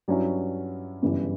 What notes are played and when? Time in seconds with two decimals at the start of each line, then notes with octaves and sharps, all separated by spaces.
0.08 G2 F#3 C#4 E4
1.03 G1 F#2 C#3 E3 G3